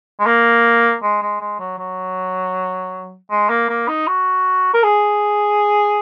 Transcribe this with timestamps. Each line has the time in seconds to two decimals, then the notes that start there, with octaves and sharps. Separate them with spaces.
0.19 G#3
0.26 A#3
1.03 G#3
1.22 G#3
1.41 G#3
1.59 F#3
1.78 F#3
3.31 G#3
3.49 A#3
3.69 A#3
3.88 D#4
4.07 F#4
4.74 A#4
4.83 G#4